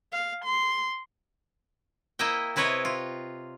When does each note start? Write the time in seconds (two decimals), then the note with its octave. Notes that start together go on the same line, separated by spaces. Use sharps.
0.12 F5
0.45 C6
2.19 A#3 E4 D#5 E5 G5
2.56 C3 E4 B4 C#5 D#5
2.85 F4